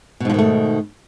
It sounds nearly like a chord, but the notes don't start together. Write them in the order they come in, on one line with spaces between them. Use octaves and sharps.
B2 G#2 F3 D#3 A3